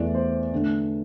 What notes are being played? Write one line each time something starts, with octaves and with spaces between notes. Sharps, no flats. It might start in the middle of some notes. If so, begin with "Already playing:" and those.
Already playing: E2 E3 A3 D5
C5
D3 A3 D4